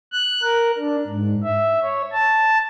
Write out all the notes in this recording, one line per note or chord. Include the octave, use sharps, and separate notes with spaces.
F#6
A#4
D4
G#2
E5
C#5
A5